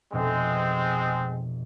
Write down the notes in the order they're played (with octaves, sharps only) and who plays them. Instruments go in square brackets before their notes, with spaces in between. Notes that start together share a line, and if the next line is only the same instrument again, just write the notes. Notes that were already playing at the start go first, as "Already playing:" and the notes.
[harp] F1 B2 D#5 [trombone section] G#3 C4